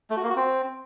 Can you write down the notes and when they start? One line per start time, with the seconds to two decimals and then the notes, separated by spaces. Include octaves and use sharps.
0.10 A3
0.17 F#4
0.23 A#3
0.30 F#4
0.36 C4